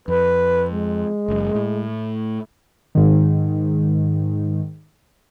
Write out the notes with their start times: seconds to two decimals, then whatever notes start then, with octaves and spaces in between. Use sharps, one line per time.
0.08 F2 B4
0.70 G#3
1.28 F#1 F#2
1.55 A2
2.95 G#2 D#3